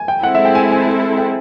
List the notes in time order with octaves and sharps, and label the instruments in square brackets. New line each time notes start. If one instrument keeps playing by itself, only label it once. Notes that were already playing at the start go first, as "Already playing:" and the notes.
Already playing: [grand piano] G#5
G5
[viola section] G#3 C4 E4 A4 [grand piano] F#5
[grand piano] E5
G5
G#5
G#5
G5